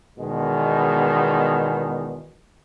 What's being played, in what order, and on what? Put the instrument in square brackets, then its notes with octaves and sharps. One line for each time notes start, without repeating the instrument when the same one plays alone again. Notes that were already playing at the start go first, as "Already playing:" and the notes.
[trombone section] E2 B2 D#3 G#3